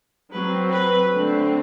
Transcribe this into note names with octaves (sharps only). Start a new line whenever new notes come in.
F#3 C4 B4
B4
D3 A3 C4